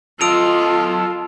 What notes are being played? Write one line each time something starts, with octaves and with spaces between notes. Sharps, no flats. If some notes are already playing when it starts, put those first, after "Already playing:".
F4 A4 D#5 A5 E6 D7 F7